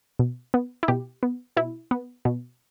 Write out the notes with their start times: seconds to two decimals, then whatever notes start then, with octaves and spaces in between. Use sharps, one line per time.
0.19 B2
0.54 B3
0.83 E4
0.88 B2 G4
1.23 B3
1.56 B2 E4
1.91 B3
2.25 B2